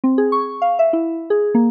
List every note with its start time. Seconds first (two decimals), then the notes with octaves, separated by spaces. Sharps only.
0.04 C4
0.18 G#4
0.32 C#6
0.62 F5
0.79 E5
0.93 E4
1.30 G#4
1.55 A#3